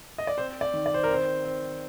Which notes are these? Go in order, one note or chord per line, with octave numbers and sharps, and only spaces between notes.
D#5
D5
C4 C5
D5
D#3
D5
C5
A#4
C4
C5
C4